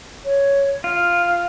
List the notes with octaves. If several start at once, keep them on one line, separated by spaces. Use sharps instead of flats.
C#5
F4 F6